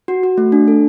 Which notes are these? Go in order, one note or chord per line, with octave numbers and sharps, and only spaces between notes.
F#4
F#4
A3
D4
A4